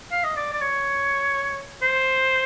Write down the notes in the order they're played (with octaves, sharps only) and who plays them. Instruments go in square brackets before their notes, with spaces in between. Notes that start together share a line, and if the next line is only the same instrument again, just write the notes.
[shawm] F5
D#5
D5
D5
C#5
C5